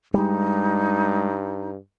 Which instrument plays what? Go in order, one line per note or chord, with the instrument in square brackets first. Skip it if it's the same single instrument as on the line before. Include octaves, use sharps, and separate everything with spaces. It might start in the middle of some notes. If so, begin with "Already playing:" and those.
[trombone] G2 [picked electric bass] G3 G#3 [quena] D#4